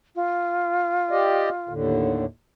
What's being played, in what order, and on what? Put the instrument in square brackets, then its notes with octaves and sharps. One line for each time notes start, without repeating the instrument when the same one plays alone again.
[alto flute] F4
[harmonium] G4 D5 D#5
D#2 A2 D3